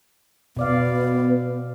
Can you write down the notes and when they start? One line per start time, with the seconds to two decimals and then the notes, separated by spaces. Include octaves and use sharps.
0.57 B2 B3 D5 F5